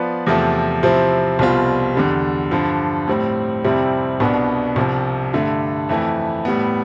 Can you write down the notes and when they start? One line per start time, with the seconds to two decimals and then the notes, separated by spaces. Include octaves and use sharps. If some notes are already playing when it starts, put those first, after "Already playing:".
Already playing: F3 B3 F4 B4 D5
0.26 E2 C3 F3 A3
0.83 C3 F3 C4 E4
1.39 C2 B2 G3 C4 F4
1.95 E2 D3 G3
2.51 G2 D3 F3
3.08 A2 G3 C4
3.64 F2 C3 G3 C4 E4
4.20 C2 B2 B3 D4
4.76 C2 C3 F3
5.33 G2 D3 A3
5.89 F2 E3 A3 E4
6.45 A2 G3 B3